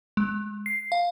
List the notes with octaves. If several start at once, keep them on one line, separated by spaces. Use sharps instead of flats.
G#3
C7
F5